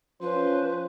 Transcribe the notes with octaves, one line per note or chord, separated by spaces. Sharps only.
F3 C#4 B4 C5